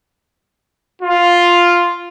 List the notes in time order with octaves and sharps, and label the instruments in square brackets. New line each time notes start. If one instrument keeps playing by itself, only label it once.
[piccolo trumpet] F4